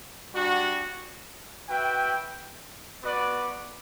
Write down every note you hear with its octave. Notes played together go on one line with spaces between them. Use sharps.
G3 D4 F#4
F#4 B4 E5 G5
B3 F#4 B4 D5